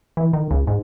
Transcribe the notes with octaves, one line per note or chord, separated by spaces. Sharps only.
E3
D#3
C#2
G#2